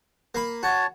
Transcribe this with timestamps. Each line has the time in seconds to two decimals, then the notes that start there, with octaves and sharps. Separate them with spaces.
0.35 A#3 B5
0.63 F#4 C#5 A5